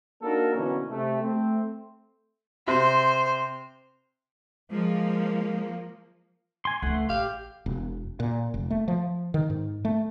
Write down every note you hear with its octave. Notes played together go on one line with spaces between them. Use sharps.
A#3 D4 D#4 F#4 A4 A#4
B2 D3 E3 F#3 A#3 C#4
C3 A3
A3 C4
C3 C5
F3 G#3 A#3
G#5 C6
C#2 E3 A3 F#5 C6
A1 G4 F5
E1
A#2
F1
A3
F3
D#3
G#2
A3